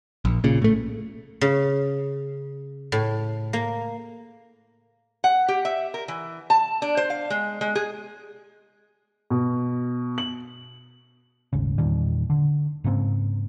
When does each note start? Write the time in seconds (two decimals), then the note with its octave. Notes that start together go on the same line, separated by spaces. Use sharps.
0.25 A#1
0.44 A#2 C#3
0.62 A2 A3
1.41 C#3
2.92 A2
3.53 A#3
5.24 F#5
5.48 G4
5.65 E5
5.94 A#4
6.08 E3
6.50 A5
6.82 D4
6.97 C5
7.10 F5
7.30 G#3
7.61 G#3
7.75 G#4
9.30 B2
10.18 F#7
11.53 D#1 G#1 C#3
11.78 E2 A#2 D#3 G3
12.30 D3
12.84 G#2 C#3 A#3 C4